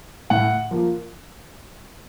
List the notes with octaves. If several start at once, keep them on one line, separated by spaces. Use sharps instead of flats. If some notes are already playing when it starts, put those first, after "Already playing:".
A2 F#5
F3 A#3